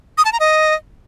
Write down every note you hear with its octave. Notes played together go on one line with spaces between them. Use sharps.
D#6
A5
A#5
D#5